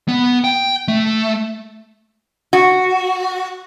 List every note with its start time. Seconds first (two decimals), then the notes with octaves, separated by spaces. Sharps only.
0.08 B3
0.44 G5
0.88 A3
2.53 F#4